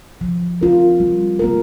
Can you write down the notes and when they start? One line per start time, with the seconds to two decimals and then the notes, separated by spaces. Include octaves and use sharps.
0.21 F3
0.61 C4 F4 A#4
1.00 G3
1.39 A#3 F4 A#4